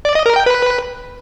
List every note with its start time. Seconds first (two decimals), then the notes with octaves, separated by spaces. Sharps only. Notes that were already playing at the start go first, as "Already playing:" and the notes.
0.05 D5
0.15 D#5
0.26 A#4
0.36 G5
0.46 B4